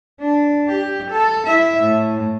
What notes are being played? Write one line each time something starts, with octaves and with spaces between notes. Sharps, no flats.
D4
G4
A4
E4 E5
A2